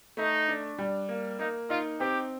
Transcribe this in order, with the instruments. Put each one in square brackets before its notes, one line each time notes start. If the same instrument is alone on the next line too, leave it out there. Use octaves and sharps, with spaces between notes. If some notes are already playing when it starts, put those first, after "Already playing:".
[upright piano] A3 [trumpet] D#4
[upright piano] D4
G3
A#3
[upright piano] A#3 [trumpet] D#4
[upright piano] D#4 [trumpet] F4
[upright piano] C4 [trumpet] G4